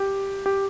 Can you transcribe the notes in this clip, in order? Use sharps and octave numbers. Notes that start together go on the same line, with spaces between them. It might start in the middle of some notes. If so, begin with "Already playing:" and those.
Already playing: G4
G4